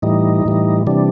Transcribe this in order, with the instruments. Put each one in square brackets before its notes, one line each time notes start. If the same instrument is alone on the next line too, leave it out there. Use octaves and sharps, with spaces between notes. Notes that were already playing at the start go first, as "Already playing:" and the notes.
[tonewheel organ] A2 E3 G3 D#4
A2 E3 G3
C3 E3 G3 D4